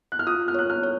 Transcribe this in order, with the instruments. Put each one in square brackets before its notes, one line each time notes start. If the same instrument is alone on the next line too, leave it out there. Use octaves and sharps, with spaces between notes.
[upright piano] F#6
F6
[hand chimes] F4 [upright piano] D#6
[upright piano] F6
[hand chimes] C#5 [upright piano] F#6
[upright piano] F6
[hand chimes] C#5